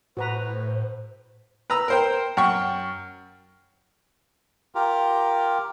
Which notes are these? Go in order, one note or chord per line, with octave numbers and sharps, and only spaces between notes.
A2 F#4 B4 C5 A#5
B4 A#5 E6
A#4 C5 G5
F#2 G5 C#6
F4 G4 A#4